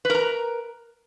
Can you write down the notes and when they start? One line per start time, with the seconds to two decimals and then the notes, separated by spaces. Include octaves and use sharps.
0.05 B4
0.10 A#4
0.15 A#5